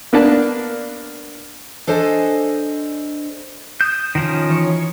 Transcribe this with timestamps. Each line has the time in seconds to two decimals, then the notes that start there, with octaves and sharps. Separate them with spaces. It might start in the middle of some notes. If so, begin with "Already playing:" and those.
0.13 A#3 B3 D4 B4 D5 A5
1.87 D4 A4 C5 D#5 G#5
3.81 D#6 G6 E7
4.15 D#3 F3 C#4
4.50 E3 C#5 C#7